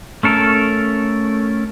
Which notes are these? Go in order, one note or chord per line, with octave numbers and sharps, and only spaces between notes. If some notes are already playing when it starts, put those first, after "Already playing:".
A3 C#4 A4 A#4